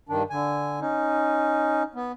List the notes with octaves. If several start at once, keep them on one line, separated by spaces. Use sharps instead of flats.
G2 D#3 D4
D3 G#5
C#4 D#4
B3